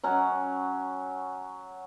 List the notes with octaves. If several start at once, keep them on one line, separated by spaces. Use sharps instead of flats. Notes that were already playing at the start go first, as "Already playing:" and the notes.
F#3 C#4 F#5